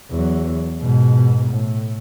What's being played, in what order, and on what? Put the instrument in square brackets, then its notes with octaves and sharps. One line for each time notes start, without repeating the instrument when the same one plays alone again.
[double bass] E2 F#3
G#2 B2
A2